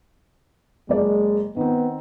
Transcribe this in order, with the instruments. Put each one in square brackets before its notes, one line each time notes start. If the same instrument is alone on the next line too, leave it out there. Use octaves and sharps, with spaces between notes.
[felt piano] F#1 D5 [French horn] G#3
[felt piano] D#3 C4 [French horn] B3